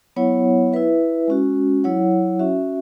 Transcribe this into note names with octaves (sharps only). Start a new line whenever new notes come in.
F#3 B3 E4 C#5 F#5
E4 B4 E5
G#3 C#4 F#4
F#3 E4 C#5 F#5
C#4 F#4 E5